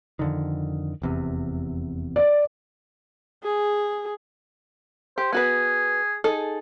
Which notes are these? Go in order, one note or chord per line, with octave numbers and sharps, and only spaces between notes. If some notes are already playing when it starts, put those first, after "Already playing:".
F2 D3 D#3
F1 E2 C3
D5
G#4
G4 C5
B3 F#4 G#4 B4
D#4 G#4 A4